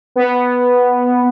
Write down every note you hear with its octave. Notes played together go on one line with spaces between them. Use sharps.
B3